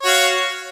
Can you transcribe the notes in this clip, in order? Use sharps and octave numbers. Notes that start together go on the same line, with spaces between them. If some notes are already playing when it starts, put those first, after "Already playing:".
F#4 C#5 F5